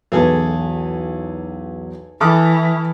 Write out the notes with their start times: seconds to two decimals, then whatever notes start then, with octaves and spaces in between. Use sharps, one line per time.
0.12 B1 E2 E3 G#4 A4
2.21 E3 E4 A4 D6 D#6 F6 F#6